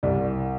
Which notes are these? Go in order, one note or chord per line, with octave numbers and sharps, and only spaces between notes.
C2 D5